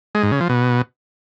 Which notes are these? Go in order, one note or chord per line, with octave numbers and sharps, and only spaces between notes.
G#3
G#2
C#3
F3
B2